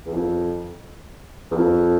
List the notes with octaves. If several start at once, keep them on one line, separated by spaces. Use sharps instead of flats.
E2
F2
E2
F2